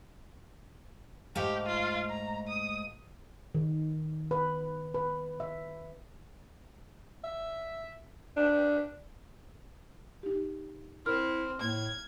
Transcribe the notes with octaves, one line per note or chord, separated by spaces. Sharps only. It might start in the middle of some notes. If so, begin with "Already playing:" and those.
G#2 A3 G4 F5
F4
A#5
D#6
D#3
B4
B4
E5
E5
D4
D#4 G4
C4 E4 A#4 F6
A2 A#3 G#6